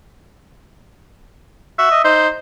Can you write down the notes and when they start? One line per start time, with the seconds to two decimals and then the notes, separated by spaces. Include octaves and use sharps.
1.78 F#4 E5
1.91 D#5
2.04 D#4 C5